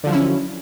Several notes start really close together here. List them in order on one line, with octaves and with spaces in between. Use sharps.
D3 F3 F#3 E4 C#4